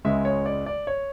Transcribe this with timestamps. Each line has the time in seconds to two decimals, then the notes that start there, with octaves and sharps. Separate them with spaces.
0.05 C#2 C#3 G#3 E5
0.25 C#5
0.46 D5
0.66 D5
0.87 C#5